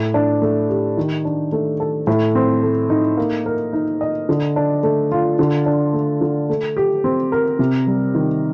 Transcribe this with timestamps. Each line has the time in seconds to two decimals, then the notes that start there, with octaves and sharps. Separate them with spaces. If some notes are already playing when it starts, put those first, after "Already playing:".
Already playing: A2
0.14 D4
0.42 A3
0.69 G4
0.97 D#3
1.25 D4
1.52 A3
1.80 A4
2.07 A2
2.35 C4
2.63 A3
2.90 D#4
3.17 A#3
3.46 A#4
3.73 D#4
4.01 D#5
4.29 D3
4.56 D4
4.83 A3
5.12 F4
5.39 D3
5.66 D4
5.93 A3
6.21 D3
6.50 A3
6.77 G4
7.04 C4
7.32 A#4
7.59 C3
7.87 G3
8.15 D#3